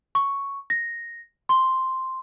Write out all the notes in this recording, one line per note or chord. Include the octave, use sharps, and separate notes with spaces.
C#6
A#6
C6